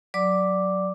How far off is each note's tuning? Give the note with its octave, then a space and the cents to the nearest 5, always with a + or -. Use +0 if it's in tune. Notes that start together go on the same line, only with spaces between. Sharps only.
F#3 +0 D5 +0 D6 +0